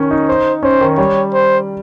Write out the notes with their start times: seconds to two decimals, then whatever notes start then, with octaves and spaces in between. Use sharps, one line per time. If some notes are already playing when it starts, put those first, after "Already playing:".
Already playing: D#3 C#4
0.11 D#4
0.28 C5
0.63 C#4 C5
0.81 D#3
0.98 G3 C#5
1.33 C5